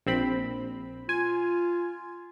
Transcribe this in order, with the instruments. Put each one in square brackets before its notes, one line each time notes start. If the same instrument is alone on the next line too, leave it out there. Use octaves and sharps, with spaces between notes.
[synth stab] A#1 C4 B5
[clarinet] F4 [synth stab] G#5